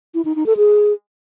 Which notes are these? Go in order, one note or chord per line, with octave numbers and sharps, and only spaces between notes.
E4
D#4
D#4
A4
G#4